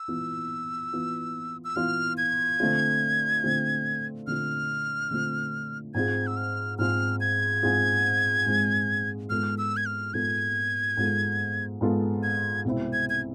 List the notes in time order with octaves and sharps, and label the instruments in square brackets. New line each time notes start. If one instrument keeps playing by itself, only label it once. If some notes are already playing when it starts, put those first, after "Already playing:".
Already playing: [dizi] E6
[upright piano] E3 B3 F4
E3 B3 F4
[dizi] E6
[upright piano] E3 B3 F4 [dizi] F6
[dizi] G#6
[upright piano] D3 A3 C4 F4
D3 A3 C4 F4
[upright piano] D3 A3 C4 F4 [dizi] F6
[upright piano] D3 A3 C4 F4
[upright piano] G#2 G#3 C4 F4 G#4 [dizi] G#6
[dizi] E6
F6
[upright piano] G#2 G#3 C4 F4 G#4 [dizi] F6
[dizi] G#6
[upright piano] G#2 G#3 C4 F4 G#4
G#2 G#3 C4 F4 G#4
[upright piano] G#2 G#3 B3 F4 A4 [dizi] F6
[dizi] E6
G#6
F6
[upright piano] G#2 G#3 B3 F4 A4 [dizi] G#6
[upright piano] G#2 G#3 B3 F4 A4
G#2 G#3 B3 F4 A4
[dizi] G#6
[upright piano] C2 B2 G#3 C4 E4
[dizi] G#6
G#6